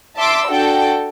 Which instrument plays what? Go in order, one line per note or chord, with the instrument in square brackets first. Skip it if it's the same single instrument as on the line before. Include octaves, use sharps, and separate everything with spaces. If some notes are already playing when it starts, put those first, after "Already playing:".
[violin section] E5 A5 C6 D6 E6
D4 F#4 A4 G5